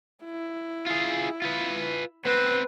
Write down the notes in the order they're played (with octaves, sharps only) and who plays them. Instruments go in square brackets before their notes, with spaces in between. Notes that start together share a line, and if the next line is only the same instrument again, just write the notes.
[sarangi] E4
[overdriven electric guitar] F4 G#4
F4 B4
[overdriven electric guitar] B3 C4 [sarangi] B4